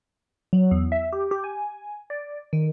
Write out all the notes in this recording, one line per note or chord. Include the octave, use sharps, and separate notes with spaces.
F#3
E2
E5
G4
G4
G#5
D5
D#3